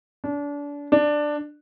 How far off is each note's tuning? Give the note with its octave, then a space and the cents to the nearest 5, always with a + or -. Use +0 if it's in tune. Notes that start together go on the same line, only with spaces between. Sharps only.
D4 -30
D4 +10